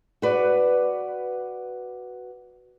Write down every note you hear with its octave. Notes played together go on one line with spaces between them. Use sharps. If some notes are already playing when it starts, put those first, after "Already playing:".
F#4 B4 D5